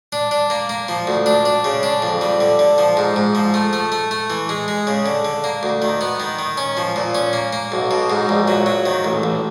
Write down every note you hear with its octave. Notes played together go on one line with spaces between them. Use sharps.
D4
D4
A#3
A#3
F3
D2
D4
D4
C#3
D4
F2
G3
D3
D3
F3
G#2
G#2
F3
A3
A3
A3
A3
E3
G#3
G#3
C#3
D3
D3
A#3
D2
D#3
B3
D#3
D#3
C#4
F3
A#2
C#4
A#3
A#3
B1
B2
G#2
A#1
F#3
F#3
D#3
A1
A1